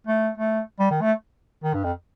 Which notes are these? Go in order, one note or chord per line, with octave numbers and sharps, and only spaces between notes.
A3
A3
G3
D#3
A3
D#3
G2
F2